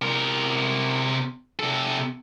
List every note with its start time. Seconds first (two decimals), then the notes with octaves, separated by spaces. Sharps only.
0.02 C3 A#4
1.59 C3 A4